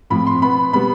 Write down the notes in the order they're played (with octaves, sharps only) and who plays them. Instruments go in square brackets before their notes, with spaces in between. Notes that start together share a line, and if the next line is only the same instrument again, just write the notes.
[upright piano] A2 F3 C4 B5
C6
B2 B3 B5
B2 G3 B3 B5